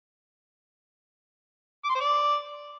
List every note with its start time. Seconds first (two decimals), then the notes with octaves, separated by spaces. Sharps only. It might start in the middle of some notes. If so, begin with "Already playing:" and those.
1.84 D6
1.90 C6
1.95 C5
2.00 D5